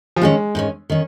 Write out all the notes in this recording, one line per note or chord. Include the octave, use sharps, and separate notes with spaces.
F3
G#2 D#3 G#3 C#4
G#2 D#3 C#4
D#3 C#4